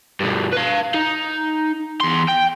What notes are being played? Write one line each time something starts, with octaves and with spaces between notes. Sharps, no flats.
G2 B2
B4 F5
D#4
E2 C6
G5